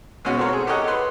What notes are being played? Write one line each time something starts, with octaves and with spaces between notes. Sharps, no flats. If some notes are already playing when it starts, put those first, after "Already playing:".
B2 G#3 C#4 F#4
C4 F#4 A4 A#4 C#5
G#4
G4 A4 A#4 C#5 D#5 F#5
B4 B5 C6